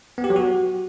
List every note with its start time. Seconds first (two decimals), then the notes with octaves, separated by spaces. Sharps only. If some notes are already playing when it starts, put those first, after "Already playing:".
0.18 B3
0.24 G4
0.30 F#3
0.36 F#4